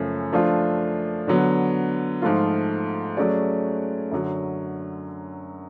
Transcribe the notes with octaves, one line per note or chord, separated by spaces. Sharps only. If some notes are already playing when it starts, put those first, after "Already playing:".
Already playing: F#2 C#3 F3 A3 C#4
F3 A3 D4 F4
D3 F#3 B3
G#2 F3 A3 F4
F#3 A3 C#4 G#4 D5
F#2 D3 F#3